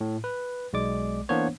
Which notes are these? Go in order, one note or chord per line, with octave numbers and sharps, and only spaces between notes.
A2
B4
B1 G#3 D5 D6
E3 A#3 B3 D4 C5 C#5